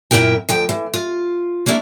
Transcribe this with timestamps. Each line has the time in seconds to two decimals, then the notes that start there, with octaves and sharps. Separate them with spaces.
0.11 F#2 A#2 F#3 E4 A#4 G5
0.49 D2 F3 G5
0.69 E3
0.94 F4
1.66 A#3 C#4 D4 E4